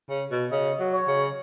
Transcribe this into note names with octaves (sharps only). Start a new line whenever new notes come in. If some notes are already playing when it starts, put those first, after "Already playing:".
C#3
B2
C#3 D#5
F#3
C#5
C#3